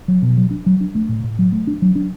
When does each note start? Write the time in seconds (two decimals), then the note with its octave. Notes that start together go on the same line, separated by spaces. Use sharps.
0.08 F#3
0.22 B2
0.37 F#3
0.51 D4
0.66 F#3
0.81 D4
0.95 A3
1.09 A2
1.24 A2
1.39 F#3
1.52 A3
1.67 D4
1.82 F#3
1.95 D4